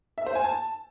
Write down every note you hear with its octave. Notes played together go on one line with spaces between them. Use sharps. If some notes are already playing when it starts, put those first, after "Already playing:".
E5
C5
G#5
A5